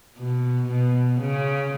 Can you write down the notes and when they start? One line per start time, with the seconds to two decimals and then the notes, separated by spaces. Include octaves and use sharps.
0.18 B2
0.68 B2
1.20 C#3